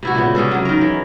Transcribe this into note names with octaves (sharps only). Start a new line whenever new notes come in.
C3 E4 F#4
A#2 C#3 B3
C3 C#4 G#4 A4
C#3 F#3
D#3 A#4
E3